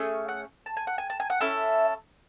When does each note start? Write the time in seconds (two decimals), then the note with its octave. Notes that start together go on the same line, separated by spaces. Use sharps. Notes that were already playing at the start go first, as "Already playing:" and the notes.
Already playing: A3 C#4 G#4
0.28 F#5
0.66 A5
0.77 G#5
0.87 F#5
0.98 G#5
1.10 A5
1.20 G#5
1.30 F#5
1.41 C#4 E4 A4 E5